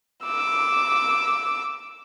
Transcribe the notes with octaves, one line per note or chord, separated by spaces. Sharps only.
D6 E6